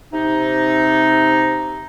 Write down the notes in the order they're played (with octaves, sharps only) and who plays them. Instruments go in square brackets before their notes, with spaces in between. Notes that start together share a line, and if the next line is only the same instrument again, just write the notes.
[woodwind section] C3 D#4